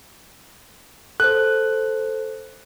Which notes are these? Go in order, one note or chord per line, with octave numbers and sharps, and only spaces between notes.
A4 C5 F#6